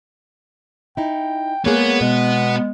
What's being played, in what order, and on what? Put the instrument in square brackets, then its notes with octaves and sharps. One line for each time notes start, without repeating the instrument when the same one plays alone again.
[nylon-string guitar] D#4 E4 [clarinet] G5
[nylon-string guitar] G#3 A#3 G#4 [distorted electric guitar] B3 [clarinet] C#5
[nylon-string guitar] B2 [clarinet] G#3